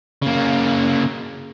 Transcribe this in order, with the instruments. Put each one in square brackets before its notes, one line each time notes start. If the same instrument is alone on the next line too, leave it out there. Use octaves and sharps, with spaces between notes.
[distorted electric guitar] C#3 A#3